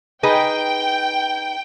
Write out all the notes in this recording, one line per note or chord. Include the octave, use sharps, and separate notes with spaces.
D#4 G#4 B4 G5